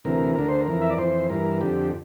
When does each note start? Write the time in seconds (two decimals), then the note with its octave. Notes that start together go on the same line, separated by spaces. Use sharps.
0.04 D2 C3 E3 A#4
0.36 D2 D3 A#4
0.48 C5
0.60 A#4
0.68 F2 E3
0.82 E5
0.90 D5
0.98 F2 E3 C5
1.29 G2 E3 A#4
1.61 F2 D3 G4